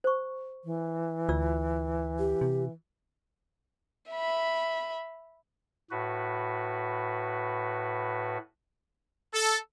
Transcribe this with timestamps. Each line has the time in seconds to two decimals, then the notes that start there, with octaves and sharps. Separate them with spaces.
0.04 C5 C#6
0.65 E3
1.29 D2 F4 D5 E6
2.19 G4
2.41 C3
4.11 E5 B5
5.91 A2 F#4 B4
9.34 A4